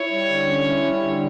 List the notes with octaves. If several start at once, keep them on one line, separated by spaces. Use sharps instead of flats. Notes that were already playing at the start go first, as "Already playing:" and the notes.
Already playing: E4 C#5
G3
D3
C#4
E4
G3
D3